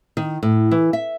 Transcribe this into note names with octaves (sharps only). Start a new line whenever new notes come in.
D#3
A2
E3
E5